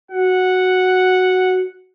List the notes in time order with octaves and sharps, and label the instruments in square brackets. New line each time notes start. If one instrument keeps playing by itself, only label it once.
[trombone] F#4 [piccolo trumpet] F#5